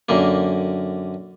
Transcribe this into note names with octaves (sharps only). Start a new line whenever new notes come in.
F#2 D3 A#3